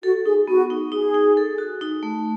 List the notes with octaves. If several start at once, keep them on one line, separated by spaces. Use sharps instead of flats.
F#4 A4
D#4 G#4
B3 F#4
D#4
D#4 G#4
D#4
A4
F#4
D#4
A3